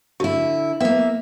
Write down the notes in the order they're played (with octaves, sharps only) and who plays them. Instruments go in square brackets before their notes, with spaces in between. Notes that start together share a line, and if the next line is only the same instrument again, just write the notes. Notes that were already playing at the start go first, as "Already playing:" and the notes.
[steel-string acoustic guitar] D3 E4 [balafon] F#4
[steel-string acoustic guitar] A#3 E5 [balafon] B3 B4